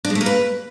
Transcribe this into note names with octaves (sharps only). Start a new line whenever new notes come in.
D4
G#3
A3
A#3
B4